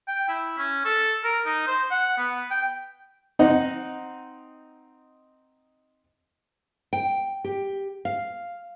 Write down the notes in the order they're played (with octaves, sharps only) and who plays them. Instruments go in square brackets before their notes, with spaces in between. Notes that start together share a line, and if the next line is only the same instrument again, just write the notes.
[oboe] G5
E4
C#4
A4
A#4
D#4
C5
F#5
B3
G5
[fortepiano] C4 D#4 D#5 F#5
[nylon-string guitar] G5
G4
F5